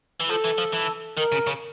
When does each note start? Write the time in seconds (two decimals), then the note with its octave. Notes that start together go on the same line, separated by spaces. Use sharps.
0.20 E3
0.29 F3 A4
0.45 E3
0.58 F3
0.73 E3
1.17 D#3 A#4
1.32 C#3
1.47 C#3